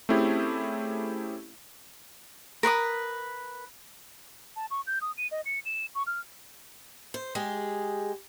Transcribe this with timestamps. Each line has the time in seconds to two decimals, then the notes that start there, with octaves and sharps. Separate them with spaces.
0.09 A3 C4 C#4 E4 G4 G#4
2.63 A#4 B4 C6 D#6
4.56 A5
4.71 C#6
4.87 G6
5.01 D#6
5.17 D#7
5.31 D#5
5.45 C#7
5.65 E7
5.95 C#6
6.07 F6
7.14 C5
7.35 G#3 G4 G#4